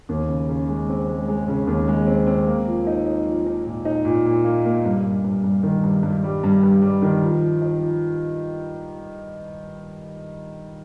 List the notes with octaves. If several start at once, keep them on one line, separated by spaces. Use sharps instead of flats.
D#2
C#3
C#3
G#3
C4
G#3
G#3
C#3
D#2
G#3
C4
C4
A#3
F3
D#4
D#4
F3
D#4
A#2
D#4
A#2
A#2
A#3
A#3
G2
G2
G2
G2
D#3
G2
G2
G3
G2
G2
G3
D#3
F3
F3
D#4
F3